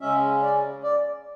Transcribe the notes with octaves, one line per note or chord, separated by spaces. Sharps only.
C#3 G#3 C#4 E5
D5
D5